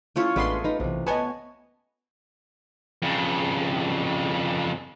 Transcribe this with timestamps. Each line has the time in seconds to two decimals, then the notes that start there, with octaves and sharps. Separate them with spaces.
0.16 A3 C#4 E4 F4 C#5
0.36 A1 G#3 A3 B3 D4 G#4 B4 C6
0.64 A#3 D#4 B4
0.80 B1 C3 E3
1.07 B3 C#5 D#5 G#5 A5
3.02 F2 C#3